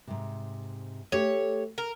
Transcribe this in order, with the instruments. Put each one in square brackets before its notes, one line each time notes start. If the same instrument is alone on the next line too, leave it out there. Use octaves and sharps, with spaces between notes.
[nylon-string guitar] G#2 C3
[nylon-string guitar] A3 G4 [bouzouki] C#5
[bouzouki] A#4